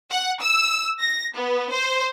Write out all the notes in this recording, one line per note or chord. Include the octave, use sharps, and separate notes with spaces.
F#5
E6
A#6
B3
C5